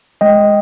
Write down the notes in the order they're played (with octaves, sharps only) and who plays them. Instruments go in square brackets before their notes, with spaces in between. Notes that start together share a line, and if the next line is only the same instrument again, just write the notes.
[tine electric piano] G#3 D#5 G5